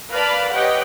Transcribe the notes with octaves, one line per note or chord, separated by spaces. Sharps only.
A#4 B4 D5 F5 A5 B5
G4 B4 C#5 D#5 F#5 G5